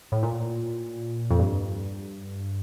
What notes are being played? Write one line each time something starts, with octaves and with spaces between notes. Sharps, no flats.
A2
A#2
F2
G2